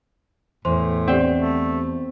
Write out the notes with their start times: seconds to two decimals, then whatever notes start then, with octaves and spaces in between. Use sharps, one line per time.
0.65 E2 A2 C5 C6
1.08 C4 G4 D5 F#5
1.39 A3